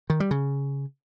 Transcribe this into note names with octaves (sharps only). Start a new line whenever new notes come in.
D#3
G3
C#3